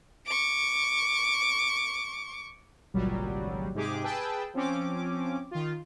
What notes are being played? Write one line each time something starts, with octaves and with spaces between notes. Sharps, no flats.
C#6 D6
G#1 C#2 A#2 F#3 G3
G#2 C3 G4 G#4 D6
G#4 B4 G5 A5 B5 E6
F3 C4 C#4 D6
D#3 F4